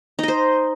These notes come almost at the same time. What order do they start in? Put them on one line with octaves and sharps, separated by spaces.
D#4 D#5 C5